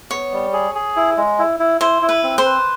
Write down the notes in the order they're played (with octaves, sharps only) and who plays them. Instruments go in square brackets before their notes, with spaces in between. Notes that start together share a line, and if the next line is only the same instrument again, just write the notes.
[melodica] B3 [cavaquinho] C#5
[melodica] G3
G#4
G#4
E4
G#3
E4
E4
[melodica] E4 [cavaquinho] C5
[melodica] E4
[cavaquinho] B4
[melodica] C4
[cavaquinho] C5
[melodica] B4